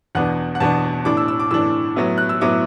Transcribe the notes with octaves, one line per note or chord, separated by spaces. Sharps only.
E2 B2 B3 D4 F#5
F#5
E2 B2 B3 D4 A5
A2 E3 D4 D6
E6
E6
D6
A2 E3 D4 E6
A2 F#3 B3 E4
F#6
E6
A2 F#3 B3 E4 D6